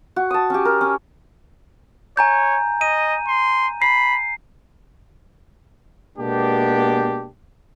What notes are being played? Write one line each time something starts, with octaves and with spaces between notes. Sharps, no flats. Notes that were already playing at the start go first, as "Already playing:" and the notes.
F#4
A5 D#6
C#4 G4
A#4
C#4
C#5 G#5 A#5 G6
D#5 D#7
C6
B5 C7
B2 G#3 A#3 B3 D4 G4